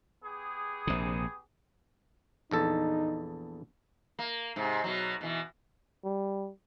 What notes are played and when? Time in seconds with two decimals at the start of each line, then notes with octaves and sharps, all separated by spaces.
0.23 B3 G4 G#4
0.87 A#1 C3
2.51 A#1 E2 D#4 A4
4.19 A#3
4.56 G#2 C3
4.84 B2 F#3
5.21 B2 E3
6.04 G3